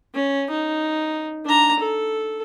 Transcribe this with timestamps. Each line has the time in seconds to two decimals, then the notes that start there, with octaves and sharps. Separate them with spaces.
0.15 C#4
0.50 D#4
1.45 D4 A#5
1.79 A4